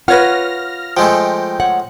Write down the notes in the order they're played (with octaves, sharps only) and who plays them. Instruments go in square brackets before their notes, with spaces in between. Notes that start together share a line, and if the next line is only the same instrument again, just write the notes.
[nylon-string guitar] F4 [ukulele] B4 C#5 F#5 [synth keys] F6 A#6
[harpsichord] F3 G#3 A3 [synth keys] G5
[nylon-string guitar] C#5 F#5